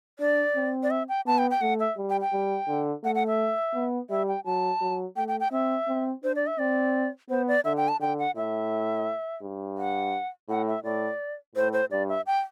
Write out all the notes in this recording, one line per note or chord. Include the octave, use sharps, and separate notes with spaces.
D4 D5
C4
D5
E5
G5
B3 A5
G5
G5
A3 F#5
E5
G3
G5
G5
G3
D3
A3 F#5
F#5
E5
B3
G3 E5
G5
F#3 A5
F#3
A3 G5
G5
G5
C4 E5
C4
D4 C5
D5
E5
C4 D5
B3 C5
D5
D3 E5
G5
A5
D3 G5
F#5
A2 E5
G2
F#5
A2 F#5
E5
A2 D5
A2 C5
C5
G2 D5
E5
G5